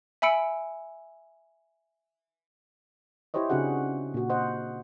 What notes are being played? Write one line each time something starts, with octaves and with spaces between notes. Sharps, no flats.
E5 G#5 B5 E6 C#7 D7
E4 G4 C5 C#5 D#5
C#3 C4 D4 F#4 G#4 F#5
A#2 F#4
C5 D#5 F#5